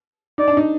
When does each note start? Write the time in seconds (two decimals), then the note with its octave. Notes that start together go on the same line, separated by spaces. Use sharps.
0.38 D#4 D5
0.48 D4
0.57 D#4